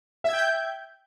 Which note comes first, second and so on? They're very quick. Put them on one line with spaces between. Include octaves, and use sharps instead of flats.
E5 G#6 G5 G6